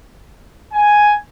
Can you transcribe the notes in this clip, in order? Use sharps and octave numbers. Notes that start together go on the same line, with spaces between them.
G#5